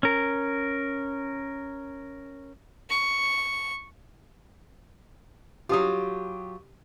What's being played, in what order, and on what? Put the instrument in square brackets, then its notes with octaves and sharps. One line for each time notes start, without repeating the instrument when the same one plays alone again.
[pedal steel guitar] C#4 A#4
[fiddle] C#6
[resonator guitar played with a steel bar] F#3 F4 [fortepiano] G4 D#6